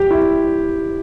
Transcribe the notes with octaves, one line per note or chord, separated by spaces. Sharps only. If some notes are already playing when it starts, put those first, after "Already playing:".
Already playing: G4
E4